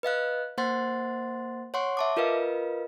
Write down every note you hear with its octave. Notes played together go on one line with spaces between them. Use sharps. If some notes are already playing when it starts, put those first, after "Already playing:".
B4 D#5 F5 F#6
A#3 C5 F#5 C6 A6
C#5 F#5 C6 C#6
E5 A5 D6
F4 A#4 B4 D#5 F5